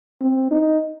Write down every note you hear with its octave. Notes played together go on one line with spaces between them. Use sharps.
C4
D#4